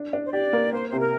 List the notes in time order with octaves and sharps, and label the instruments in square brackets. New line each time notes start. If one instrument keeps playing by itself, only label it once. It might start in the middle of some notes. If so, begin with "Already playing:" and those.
Already playing: [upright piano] D4
D4
[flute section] C5
[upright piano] G4 [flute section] D5
[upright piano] A#3
[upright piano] A#3 [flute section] C5
[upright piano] C3 [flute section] C5
[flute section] A#4